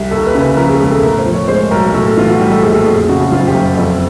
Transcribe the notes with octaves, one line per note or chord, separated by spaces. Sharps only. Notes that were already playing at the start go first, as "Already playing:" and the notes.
Already playing: C2
D#2 A4
B4
C#3
B4
F3 A#4
G#4
E1 G#4
A4
A2 A#4
C5
F3
C#5
G#3 C5
B1 A#4
A2 A4
A4
E3 F4
F#4
G3 G4
A4
A#1 G#4
A4
F2 G#4
C#3 F#4
F#1 F4
G4
F#1
F2